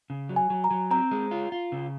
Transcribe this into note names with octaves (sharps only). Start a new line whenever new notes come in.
C#3
F#3
G#5
F#3
A#5
F#3
C4 A#5
G#3
F4
F4
C#3